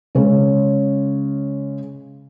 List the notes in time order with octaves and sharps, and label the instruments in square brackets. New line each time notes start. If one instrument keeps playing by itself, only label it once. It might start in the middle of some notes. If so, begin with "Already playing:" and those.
[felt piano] C#3 G#3 C#4